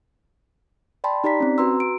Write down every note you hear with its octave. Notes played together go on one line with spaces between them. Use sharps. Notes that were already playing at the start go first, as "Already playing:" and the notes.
D5 G5 A5 B5 C6
D#4 G4 D5 A#5 B6
C4 C#4
F#4 B4 A#5 C6 E6
D7